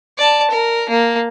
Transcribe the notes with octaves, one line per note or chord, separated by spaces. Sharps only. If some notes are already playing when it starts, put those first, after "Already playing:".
D5 A5
A#4
A#3